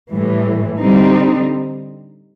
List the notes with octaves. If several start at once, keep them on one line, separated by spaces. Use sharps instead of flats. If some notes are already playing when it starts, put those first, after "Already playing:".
A2 E3 G3
D3 G3 C4 D#4